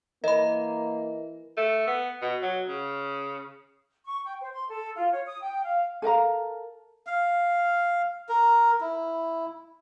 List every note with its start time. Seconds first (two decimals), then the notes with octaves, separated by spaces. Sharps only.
0.24 E3 A#3 A#4 D#5 B5
1.57 A3
1.87 B3
2.22 B2
2.42 F#3
2.68 C#3
4.06 C#6
4.24 G5
4.41 C5
4.52 C6
4.70 A4
4.95 F4
5.12 C#5
5.26 D#6
5.43 G5
5.64 F5
6.02 A4 A#4 F5 A#5
7.07 F5
8.29 A#4
8.81 E4